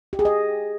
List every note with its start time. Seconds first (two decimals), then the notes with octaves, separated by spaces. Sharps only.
0.13 G4
0.19 G#4
0.25 D#5